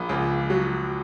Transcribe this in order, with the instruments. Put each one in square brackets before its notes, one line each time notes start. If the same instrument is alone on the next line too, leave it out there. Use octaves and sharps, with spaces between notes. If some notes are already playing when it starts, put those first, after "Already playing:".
Already playing: [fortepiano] A#1
C#2
F#3